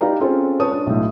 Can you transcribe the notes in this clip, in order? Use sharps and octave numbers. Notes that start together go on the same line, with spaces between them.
D#4 G4 B4 D5 F5 A#5
C4 C#4 F4 G#4 A4 C5
B4 C#5 A5 D#6
D4
B1 A2